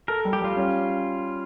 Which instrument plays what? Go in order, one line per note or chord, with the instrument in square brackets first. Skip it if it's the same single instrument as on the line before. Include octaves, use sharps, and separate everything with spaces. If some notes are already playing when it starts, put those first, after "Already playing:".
[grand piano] A4 [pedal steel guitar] A#4
[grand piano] G3
[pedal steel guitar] G4
[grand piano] G3 [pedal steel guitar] F4
[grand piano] C#4